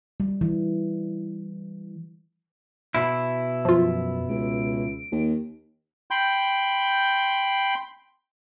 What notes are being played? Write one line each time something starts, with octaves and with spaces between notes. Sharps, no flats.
G3
E3
B2 E4
F#2 F3 F4
C#2 D7
D#2
G5 B5 C6 G6